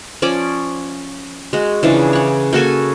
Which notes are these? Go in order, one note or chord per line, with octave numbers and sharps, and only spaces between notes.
F3 C#4 D5 D6
G#3 F#4
C#3 E3 F3 D4
C#5 F#5
A#3 F#4 A4 G#5